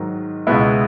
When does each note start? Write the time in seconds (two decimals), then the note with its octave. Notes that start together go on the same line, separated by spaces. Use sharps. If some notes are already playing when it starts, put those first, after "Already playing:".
Already playing: G#2 D#3 F#3
0.47 C#2 B2 G#3 B3 E4